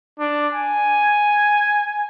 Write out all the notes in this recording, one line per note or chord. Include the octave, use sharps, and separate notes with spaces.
D4
G#5